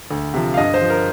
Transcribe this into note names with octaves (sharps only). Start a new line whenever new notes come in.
D2
C3 F3
F5
G2 D#5
C5
F3
A#4